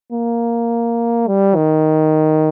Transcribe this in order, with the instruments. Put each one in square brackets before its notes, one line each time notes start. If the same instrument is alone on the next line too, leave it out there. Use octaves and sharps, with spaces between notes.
[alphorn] A#3
G3
D#3